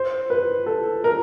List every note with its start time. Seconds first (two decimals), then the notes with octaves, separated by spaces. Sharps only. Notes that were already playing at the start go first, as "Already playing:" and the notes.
Already playing: C5
0.30 B4
0.66 A4
1.04 A#4